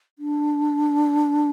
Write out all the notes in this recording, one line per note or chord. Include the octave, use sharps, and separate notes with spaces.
D4